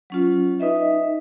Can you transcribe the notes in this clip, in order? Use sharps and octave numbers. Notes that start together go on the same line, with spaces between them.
F#3 C#4 F4
D#4 B4 D#5 E5